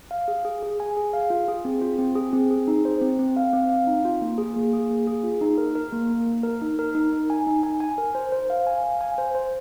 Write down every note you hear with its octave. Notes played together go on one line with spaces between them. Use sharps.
F5
G#4
G#4
G#4
G#5
G#4
F5
F4
G#4
C4
F4
C4
G#4
C4
G#4
D#4
C5
C4
C4
F5
C4
F5
D#4
F4
A#3
G#4
A#3
G#4
A#3
G#4
F4
D#4
A#4
A#4
A#3
A#3
A#3
A#4
D#4
A#4
D#4
D#4
G#5
D#4
G#5
G#5
A#4
C5
C5
F5
G#5
F5
G#5
C5
C5